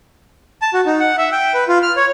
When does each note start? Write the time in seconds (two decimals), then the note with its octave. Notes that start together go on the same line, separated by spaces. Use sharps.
0.62 A5
0.74 F#4
0.86 D#4
1.00 F#5
1.18 E5
1.32 G5
1.54 B4
1.68 F4
1.83 F6
1.96 C#5